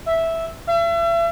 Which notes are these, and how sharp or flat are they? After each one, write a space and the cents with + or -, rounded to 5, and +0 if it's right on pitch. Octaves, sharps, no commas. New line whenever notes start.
E5 -5
E5 +40